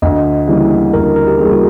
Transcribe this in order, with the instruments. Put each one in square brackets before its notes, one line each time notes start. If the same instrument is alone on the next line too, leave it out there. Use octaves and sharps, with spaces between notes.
[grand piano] D2 [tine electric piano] D#5
[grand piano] C#3 E3 G3 A#3
[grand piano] D2 [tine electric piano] A#4
[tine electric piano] A#4
G4
[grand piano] C#3 E3 G3 A#3 [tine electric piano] G#4
[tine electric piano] F#4